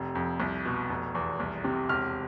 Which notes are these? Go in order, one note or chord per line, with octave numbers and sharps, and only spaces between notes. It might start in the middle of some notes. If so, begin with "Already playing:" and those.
Already playing: F1 C3
F2
C2
B2
F1
E2
C2
C3
E1 F6